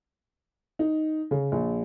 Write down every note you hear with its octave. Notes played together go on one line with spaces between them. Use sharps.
D#4
C#3
A#1